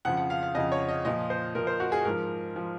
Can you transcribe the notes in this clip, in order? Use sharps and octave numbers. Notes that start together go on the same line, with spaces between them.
F2 C#3 F3 F#5
F#5
F5
F5
F2 C#3 F3 D#5
C#5
D#5
A#2 F3 D#5
C5
A#2 F3 A#4
C5
F#4
G#4
G#2 F3 A#4
F3